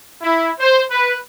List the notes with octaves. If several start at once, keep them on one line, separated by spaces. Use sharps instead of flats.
E4
C5
B4